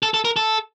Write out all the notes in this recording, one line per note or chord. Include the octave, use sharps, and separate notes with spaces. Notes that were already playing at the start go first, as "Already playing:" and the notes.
A4
A4
A#4
A4